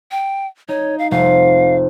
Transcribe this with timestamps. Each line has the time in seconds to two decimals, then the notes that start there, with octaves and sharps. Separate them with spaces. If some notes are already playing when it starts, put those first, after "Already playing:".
0.11 G5
0.69 D#4 C#5
0.99 F5
1.11 F1 F5